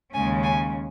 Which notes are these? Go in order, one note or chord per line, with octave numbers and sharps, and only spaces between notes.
D#2 C#3 G#3 C#4 G#5
G#5